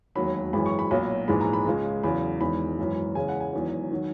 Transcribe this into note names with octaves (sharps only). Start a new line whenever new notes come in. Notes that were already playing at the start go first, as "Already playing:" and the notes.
E1 D#2 D#3 F#3 B5
G#1 F#2 E3 G#3 B5
C#6
B5
B1 A#2 F#3 B5
A#1 G#2 E3 G#3 B5
A#5
B5
C#2 C#3 G#3
E2 C#3 F#3 B5
E1 E2 D#3 G#3 B5
G#1 F#2 E3
E2 C#3 G#3 G#5
F#5
G#5
E1 E2 D#3 F#3
D#3 F#3